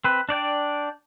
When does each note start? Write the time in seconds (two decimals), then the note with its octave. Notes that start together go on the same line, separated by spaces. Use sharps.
0.04 C4 B4
0.29 D4 D5 G5